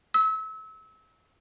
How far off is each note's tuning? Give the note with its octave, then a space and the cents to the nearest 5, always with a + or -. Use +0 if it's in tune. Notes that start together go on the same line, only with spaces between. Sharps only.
E6 -30